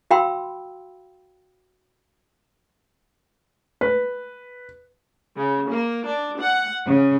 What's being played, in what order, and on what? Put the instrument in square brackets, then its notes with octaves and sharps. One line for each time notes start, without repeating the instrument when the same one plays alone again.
[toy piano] F#4 F5 G5 B5 C6 E6
[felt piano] B4
[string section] C#3
A#3
D4
F#5
C#3